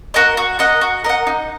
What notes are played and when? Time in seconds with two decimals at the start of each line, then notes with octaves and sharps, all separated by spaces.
0.14 F#4 A#4 D#5
0.37 F#4
0.59 A#4 D#5 F#5
0.81 F#4
1.04 A#4 D#5 F#5
1.27 D#4